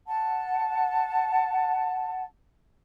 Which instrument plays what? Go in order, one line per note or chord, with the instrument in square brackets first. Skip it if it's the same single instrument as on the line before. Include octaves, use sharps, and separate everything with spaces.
[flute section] F#5 A5